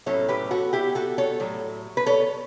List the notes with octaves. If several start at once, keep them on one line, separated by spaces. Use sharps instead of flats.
A2 F#3 A3 C#4 E4 A4 C#5
G4 B4
F#4 A4
E4 G4
F#4 A4
A4 C#5
A2 F#3
B4
A4 C#5